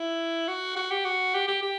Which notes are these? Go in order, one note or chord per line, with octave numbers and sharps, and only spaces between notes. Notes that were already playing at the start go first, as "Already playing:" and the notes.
Already playing: E4
F#4
F#4
G4
F#4
G4
G4
G4